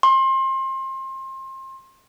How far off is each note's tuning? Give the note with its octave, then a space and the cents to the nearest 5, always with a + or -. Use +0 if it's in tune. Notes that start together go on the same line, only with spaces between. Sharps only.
C6 +30